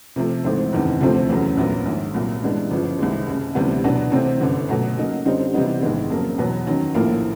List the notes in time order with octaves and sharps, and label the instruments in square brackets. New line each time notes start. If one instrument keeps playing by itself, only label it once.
[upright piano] C3 F3 A3
G#1 G#2 E3 A3 C4
F#1 E2 C3 D#3
D2 C3 F3 A3 C4
E2 C#3 F#3 A3
A#1 A#2 F#3 B3
A#1 G#2 D#3
C2 A#2 F#3
G2 E3 G#3 B3 D4
G1 F#2 C#3 F3
C2 C3 D#3 G#3
F#1 F#2 C#3
D2 C3 E3 G3 B3
B2 F#3 B3 D4
C3 E3 A3 C4
G1 F#2 D3
B2 F#3 A3
C#3 F#3 A#3 D#4
F#2 D3 G3 C4 D#4
C3 E3 G3 B3 D#4
A#1 G#2 D#3 G#3 B3
F2 C#3 F#3 A#3
E2 B2 F#3 B3
F#2 D#3 F#3
A#1 A2 F3 A#3